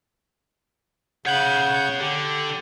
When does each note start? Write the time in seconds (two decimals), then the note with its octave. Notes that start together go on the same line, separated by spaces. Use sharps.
1.26 C#3 C#5 F#5 B5 G6
2.00 D3 G4